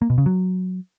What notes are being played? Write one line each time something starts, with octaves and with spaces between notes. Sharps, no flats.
A#3
B2
C#3
F#3